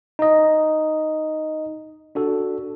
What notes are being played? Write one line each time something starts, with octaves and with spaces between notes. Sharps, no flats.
D#4 D#5
D4 F#4 A4